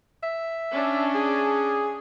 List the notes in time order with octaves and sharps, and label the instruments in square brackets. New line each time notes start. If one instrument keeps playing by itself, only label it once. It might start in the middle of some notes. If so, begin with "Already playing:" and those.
[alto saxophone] E5
[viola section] C#4 D4
[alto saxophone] G#4